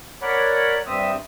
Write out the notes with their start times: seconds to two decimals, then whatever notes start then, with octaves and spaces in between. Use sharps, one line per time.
0.22 A#4 C#5 D5 F#5 B5
0.86 G2 C4 E5 D#6